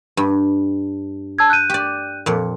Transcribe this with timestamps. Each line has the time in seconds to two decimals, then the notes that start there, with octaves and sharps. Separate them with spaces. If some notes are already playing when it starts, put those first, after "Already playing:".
0.17 G2
1.39 A5 E6 G#6
1.50 F#6 G6 D#7
1.70 G4 D5
2.26 F2 A#2